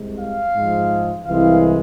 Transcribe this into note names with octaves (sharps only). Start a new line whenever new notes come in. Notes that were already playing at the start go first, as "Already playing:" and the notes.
Already playing: C2 C3 G#3
F5
G#2 F3 G#3
C2 C3 E3 G#3 F5